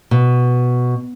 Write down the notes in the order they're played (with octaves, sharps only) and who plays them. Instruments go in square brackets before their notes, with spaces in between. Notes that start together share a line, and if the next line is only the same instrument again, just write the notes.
[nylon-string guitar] B2